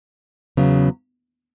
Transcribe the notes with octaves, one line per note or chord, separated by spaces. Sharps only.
E2 C#3 F#3 B3